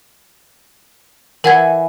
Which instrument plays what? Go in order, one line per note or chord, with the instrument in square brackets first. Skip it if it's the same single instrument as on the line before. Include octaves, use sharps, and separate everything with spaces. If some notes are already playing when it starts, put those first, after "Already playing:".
[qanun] E3 E4 G#5 [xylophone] A#4 F#5 G#6